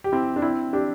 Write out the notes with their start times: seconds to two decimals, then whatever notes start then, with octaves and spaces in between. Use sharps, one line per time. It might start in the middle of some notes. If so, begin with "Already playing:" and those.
0.04 G4
0.12 C4 E4
0.36 D4
0.42 C4 E4
0.73 D4 G4